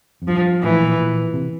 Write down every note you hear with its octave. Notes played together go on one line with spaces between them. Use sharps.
F2
G2 F3
A2 E3
A#2
A#2
C3